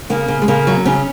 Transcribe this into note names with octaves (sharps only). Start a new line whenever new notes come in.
C#3 A#3
C#3
G#3
C#3 A#3
F#3
C#3 C#4